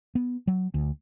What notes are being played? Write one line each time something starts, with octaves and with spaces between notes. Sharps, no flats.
B3
F#3
D2